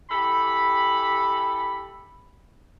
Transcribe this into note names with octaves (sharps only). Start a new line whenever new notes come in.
E3 G4 A4 B5